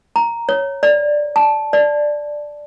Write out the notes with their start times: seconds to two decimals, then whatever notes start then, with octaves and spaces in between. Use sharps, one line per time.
0.16 A#5
0.49 C#5
0.83 D5
1.36 A5
1.73 D5